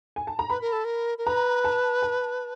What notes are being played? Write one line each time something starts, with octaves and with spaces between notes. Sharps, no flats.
G#5
A5
A#5
B4 B5
A#4
A4
A#4
A#4
B4 A#5
A5
A5